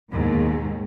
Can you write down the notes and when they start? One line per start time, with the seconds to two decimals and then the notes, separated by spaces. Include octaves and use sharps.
0.11 D#2 G#2 B2